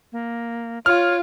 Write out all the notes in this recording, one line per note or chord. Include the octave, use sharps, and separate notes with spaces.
A#3
F4 C#5 F6